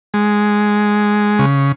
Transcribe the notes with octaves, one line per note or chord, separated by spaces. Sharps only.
G#3
C#3